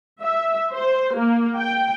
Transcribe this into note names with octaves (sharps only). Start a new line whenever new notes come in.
E5
C5
A#3
G5